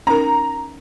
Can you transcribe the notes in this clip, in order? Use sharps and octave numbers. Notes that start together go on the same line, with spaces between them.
C#4 D#4 A#4 A#5